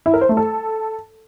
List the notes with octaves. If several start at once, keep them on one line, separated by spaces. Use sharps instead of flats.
E4
A#4
C5
A3
A4